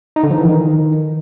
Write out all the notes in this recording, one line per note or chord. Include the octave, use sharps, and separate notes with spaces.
D#4
D3
F3
E3
D#3